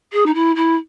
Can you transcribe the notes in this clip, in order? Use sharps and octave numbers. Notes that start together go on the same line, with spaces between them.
G#4
D#4
E4
E4